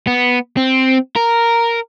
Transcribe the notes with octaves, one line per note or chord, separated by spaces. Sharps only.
B3
C4
A#4